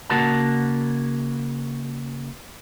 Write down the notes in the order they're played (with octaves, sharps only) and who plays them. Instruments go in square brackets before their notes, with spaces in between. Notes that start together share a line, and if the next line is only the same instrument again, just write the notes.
[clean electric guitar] C#3 A#3 F#4 A#4 F#5 A5